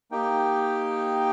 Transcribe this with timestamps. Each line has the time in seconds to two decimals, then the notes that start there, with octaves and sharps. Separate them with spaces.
0.11 A#3 D#4 G4 G5